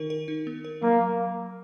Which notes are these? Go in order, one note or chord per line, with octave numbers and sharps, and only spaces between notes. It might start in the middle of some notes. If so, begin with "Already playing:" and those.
Already playing: D#3 D#4 A#4
A#4
D#4
B3
A#4
F#3 A#3
F#3